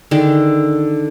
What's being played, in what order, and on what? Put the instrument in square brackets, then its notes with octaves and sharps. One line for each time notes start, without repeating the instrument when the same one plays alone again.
[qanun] D3 D#3 D4 G#4